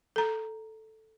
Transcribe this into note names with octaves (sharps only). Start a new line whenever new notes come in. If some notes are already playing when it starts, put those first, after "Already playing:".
A4 A#5